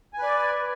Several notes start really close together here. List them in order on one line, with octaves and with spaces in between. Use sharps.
G#5 B4 D5